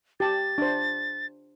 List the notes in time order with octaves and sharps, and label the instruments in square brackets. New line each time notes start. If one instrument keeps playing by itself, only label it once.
[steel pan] G4 A5 [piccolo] A6
[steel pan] D4 C5